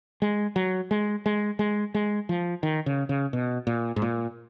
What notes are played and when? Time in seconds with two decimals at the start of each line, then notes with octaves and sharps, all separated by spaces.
0.22 G#3
0.56 F#3
0.91 G#3
1.26 G#3
1.59 G#3
1.94 G#3
2.29 F3
2.63 D#3
2.86 C#3
3.09 C#3
3.33 B2
3.67 A#2
3.96 G#2
4.02 A#2